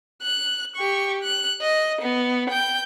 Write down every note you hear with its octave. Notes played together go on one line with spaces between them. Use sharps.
F#6
G4 C#6
F#6
D#5
B3
G5 G6